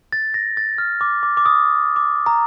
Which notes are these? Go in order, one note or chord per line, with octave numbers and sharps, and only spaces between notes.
A6
A#6
A6
F6
D6
D6
D6
D#6
D6
A#5